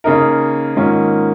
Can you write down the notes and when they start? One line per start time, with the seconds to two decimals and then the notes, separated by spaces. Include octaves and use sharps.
0.04 C#3 A#3 D#4 A#4
0.76 G#2 D#3 A#3 C#4 F4